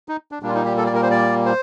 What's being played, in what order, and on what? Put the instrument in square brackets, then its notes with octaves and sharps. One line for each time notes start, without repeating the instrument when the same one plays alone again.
[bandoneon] D#4
D4
A#2 G3 A#3 D4
F4
D#4
G4
A4
D5
A#4
C5
D5
C5